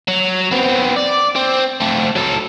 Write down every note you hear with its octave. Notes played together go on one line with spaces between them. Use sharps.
F#3
B3 C4
D5
C4
A3 C4
F#3 A4